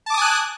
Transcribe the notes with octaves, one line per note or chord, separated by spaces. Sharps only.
G#5 A5 D6 D#6 F#6